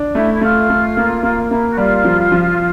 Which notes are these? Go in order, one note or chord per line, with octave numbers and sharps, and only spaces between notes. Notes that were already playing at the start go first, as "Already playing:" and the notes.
Already playing: D4
A3 E4
E4
A3 F4
A3
A#3
A#3
A#3 E4
F#4
G3 F4
F3
F3